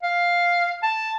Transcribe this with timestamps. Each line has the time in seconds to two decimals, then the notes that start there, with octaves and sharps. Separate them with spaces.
0.03 F5
0.83 A5